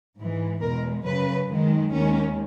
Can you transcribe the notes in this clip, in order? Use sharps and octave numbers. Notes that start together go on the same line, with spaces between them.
G#2 E3 G#3
E2 B2 G#3 A#4
F#2 C#3 F#3 B4
F#2 D#3 G#3
D#2 D#3 G#3 C#4